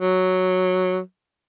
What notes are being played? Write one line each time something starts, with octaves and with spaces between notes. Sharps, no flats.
F#3